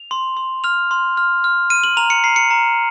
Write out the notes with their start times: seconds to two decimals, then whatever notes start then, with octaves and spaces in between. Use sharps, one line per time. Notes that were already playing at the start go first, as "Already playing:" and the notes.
Already playing: F7
0.11 C6
0.37 C6
0.64 F6 F7
0.91 C6
1.17 F6
1.44 F6
1.70 F6 D#7
1.84 F#7
1.97 A#5 F7
2.10 C#7
2.24 A#5 C7
2.36 C#7
2.51 A#5